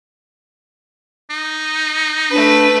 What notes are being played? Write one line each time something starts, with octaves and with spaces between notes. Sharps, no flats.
D#4
A3 D4 B4